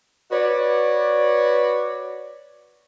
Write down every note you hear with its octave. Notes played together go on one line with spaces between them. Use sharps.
F#4 B4 C#5 D5